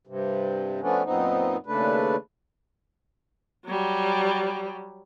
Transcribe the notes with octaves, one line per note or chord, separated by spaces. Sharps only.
G2 C3
F3 A3 B3 C#4 D4
F#2 A#2 B3 C4 D#4
D#2 C#3 A3 D4 B4
F#3 G3